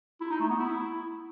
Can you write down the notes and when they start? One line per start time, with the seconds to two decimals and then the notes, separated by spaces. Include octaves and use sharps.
0.21 E4
0.30 D#4
0.40 A3
0.50 B3
0.60 E4